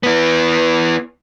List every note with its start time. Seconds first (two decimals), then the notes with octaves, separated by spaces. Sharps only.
0.03 B3 E4